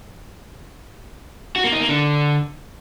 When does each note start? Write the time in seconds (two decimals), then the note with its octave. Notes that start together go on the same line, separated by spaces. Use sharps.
1.56 F#4
1.64 A#3
1.72 D#4
1.80 A#3
1.89 D3